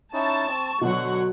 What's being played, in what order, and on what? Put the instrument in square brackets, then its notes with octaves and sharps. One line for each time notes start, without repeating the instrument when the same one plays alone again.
[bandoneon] C#4 D#4 E4 [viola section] A5 [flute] C#6
[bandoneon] C4
[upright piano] B2 [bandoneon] D3 [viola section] F#3 F#5